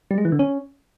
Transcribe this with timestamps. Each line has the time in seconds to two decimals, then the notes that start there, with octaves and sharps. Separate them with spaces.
0.11 G3
0.18 G#3
0.25 E3
0.32 D3
0.39 C#4